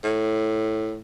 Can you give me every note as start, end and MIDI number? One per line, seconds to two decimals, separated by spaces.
0.04 1.00 45